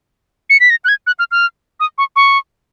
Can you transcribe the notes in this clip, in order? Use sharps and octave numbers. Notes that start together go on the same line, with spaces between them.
C#7
B6
A#6
F#6
G#6
F#6
F6
F6
D#6
C#6
C#6